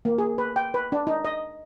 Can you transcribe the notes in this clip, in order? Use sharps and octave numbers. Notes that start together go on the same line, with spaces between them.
A#3
G#4
B4
G5
B4
D4
D#4
D#5